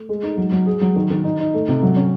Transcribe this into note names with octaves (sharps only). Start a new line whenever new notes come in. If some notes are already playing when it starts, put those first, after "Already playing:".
Already playing: A3
G#3
D#4
F#3
F#3
G#4
F#3
D#3
D#3
D#4
D#4
A3
C3
F#3
C#4